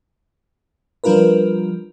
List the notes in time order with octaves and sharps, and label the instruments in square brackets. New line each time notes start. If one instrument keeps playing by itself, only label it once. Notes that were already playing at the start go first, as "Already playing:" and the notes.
[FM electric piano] F3 G3 D4 F4 A#4 B4